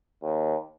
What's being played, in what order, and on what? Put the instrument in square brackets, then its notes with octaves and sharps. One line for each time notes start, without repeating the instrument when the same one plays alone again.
[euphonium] D#2